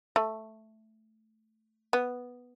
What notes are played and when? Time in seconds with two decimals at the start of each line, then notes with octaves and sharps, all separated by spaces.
0.16 A3
1.93 B3